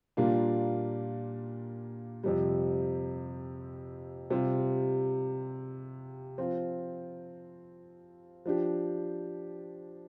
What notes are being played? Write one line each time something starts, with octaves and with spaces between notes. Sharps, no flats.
A#2 G3 A#3 D4 F4
F2 C3 G3
C3 G3 C4 F4
F3 C4 F4
F3 D4 G4